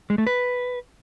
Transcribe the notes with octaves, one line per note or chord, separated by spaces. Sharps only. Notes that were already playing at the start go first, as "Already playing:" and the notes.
G#3
A3
B4